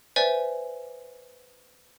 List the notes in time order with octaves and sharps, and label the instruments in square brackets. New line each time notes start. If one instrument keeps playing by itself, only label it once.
[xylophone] B4 C5 D5 E5 G#5